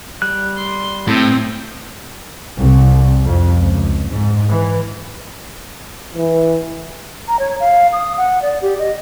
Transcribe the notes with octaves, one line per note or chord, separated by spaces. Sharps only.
G3 F#6
C6
A2 C4
C2
F2
C#2
G#2
E3
E3
A#5
C#5
F5
D#6
F#5
D5
G4
D#5